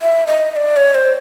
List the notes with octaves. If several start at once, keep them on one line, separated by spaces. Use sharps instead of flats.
E5
D#5
D#5
D5
C#5
C5